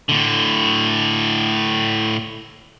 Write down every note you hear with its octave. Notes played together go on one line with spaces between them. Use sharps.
A2 D3